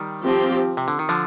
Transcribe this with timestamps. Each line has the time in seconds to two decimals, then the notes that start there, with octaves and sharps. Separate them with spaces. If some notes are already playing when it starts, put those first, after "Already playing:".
Already playing: D#3 G3
0.24 F3 C4 G4
0.77 C3
0.88 D3
0.99 D#3
1.09 D3 F3